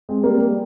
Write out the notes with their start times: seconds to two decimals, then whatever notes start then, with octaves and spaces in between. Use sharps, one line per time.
0.09 G#3 C4
0.23 G3 A#3
0.38 G3